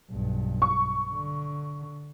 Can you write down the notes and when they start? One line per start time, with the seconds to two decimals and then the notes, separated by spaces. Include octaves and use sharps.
0.11 B1 G2
0.62 C#6
1.12 D3